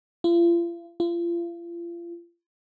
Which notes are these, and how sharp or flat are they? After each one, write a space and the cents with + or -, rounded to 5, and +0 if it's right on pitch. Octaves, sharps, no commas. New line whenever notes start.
F4 -40
F4 -35